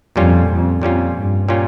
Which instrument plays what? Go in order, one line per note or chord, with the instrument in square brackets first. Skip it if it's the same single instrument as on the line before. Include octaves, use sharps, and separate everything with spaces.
[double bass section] F2 [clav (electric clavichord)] A#2 G3 C#4 F4
[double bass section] F2
[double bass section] F2 [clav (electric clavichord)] A#2 G3 C#4 F4
[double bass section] G2
[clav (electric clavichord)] A#2 G3 C#4 F4